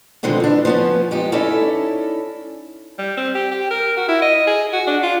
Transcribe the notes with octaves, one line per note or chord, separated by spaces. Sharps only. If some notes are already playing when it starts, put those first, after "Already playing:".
B2 D3 D#3 F3 G#3 C4
E3 D4
F3 B3 C#4
F2 G#3 D#4 G4
C#4 D#4 E4 A4 C#5 D5
G3
C4
G4
G4
A#4
F#4
E4
D#5
G#4
F#4
D4
F4